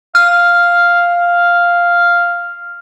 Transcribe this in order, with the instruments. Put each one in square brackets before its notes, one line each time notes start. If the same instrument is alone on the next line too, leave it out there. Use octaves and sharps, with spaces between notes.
[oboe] F5 [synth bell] F6